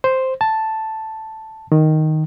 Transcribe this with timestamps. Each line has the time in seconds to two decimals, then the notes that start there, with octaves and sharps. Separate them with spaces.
0.04 C5
0.41 A5
1.72 D#3